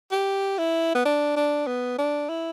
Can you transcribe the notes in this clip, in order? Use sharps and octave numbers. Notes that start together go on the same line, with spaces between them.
G4
E4
B3
D4
D4
B3
D4
E4